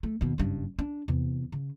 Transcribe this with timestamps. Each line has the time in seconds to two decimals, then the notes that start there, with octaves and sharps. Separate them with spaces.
0.03 A3
0.21 D#2 B2
0.38 F#1 G2
0.79 D4
1.08 E2 C3
1.52 C#3